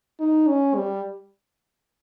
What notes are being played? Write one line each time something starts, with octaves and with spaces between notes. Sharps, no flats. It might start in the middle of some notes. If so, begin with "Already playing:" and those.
D#4
C#4
G3